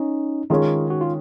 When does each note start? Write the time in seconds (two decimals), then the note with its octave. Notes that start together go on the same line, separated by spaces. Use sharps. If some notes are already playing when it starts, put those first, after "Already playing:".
Already playing: C#4 D#4
0.50 D#3 G#3 C#4 D#4 F4
0.90 F#4
1.01 F4